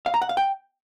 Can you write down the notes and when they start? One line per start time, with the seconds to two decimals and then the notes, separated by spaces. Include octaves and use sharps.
0.06 F5
0.14 A#5
0.22 F#5
0.29 F5
0.37 G5